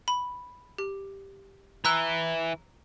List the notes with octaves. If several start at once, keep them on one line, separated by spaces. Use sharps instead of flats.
B5
G4
E3 A#5 E6 F#6